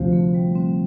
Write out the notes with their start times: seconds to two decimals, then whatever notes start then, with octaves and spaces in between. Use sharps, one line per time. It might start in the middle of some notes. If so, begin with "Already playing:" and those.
Already playing: D2 C3 F3
0.13 A3
0.34 G3
0.55 C4